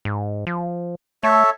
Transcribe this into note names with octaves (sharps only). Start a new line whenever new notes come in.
G#2
F3
A3 A4 C#5 E5